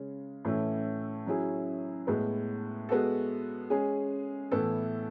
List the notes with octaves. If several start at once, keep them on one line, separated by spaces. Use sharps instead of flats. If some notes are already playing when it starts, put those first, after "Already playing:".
Already playing: C#3 G#3 C#4
A2 E3 A3 C#4 E4
F#3 C#4 E4 G#4
A2 G#3 B3
G#3 B3 F#4 A4
G#3 C#4 G#4
A2 E3 B3 E4 A4